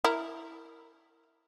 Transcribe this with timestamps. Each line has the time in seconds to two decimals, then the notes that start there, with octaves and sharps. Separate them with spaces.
0.04 E4 A#4